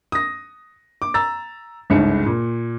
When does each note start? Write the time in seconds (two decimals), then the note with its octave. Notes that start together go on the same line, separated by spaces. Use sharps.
0.12 D#6 A#6
1.02 D6
1.14 A#5 E6 A6
1.90 G1 C#2 G#2 C#7
2.26 A#2